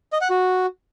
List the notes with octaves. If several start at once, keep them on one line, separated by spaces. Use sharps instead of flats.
D#5
F#5
F#4